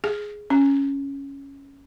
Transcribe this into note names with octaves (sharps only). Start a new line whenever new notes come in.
G#4
C#4